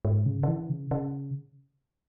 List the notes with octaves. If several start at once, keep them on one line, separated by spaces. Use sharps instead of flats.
G#2
C#3
C#3
E3
C#3
C#3